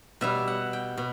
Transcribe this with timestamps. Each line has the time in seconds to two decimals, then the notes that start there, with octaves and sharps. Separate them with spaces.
0.21 B2 G3 E5
0.48 F#5
0.73 G5
0.97 B2